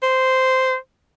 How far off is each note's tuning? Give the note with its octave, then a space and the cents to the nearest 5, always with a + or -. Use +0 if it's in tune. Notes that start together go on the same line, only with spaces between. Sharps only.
C5 -10